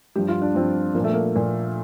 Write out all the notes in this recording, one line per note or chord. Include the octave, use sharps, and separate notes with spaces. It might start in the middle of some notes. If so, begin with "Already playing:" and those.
G2 F3 G4
F4
D4
G2 F3 C4
A#2 F3 A3 A#3
A#3
A#2 F3